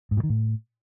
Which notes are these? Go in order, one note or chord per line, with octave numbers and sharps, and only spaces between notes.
G#2
A#2
D#3
A2